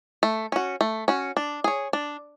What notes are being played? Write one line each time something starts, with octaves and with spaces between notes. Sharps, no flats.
A3
C#4 F#4
A3
C#4 F#4
D4
G#4 C#5
D4